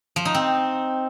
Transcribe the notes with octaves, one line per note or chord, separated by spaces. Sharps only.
F3
D#4
C4